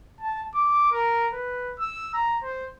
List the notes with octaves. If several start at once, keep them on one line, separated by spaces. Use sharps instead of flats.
A5
D6
A#4
B4
E6
A#5
C5